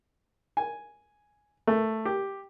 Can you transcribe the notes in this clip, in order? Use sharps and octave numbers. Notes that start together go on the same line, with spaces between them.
G#5
A3
G4